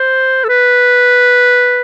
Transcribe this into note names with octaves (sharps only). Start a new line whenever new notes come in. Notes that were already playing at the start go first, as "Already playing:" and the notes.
Already playing: C5
A4
B4